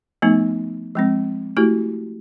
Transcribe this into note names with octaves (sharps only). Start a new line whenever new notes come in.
F3 A3 B3 D#4
F3 G#3 C4
A3 E4 F#4 G4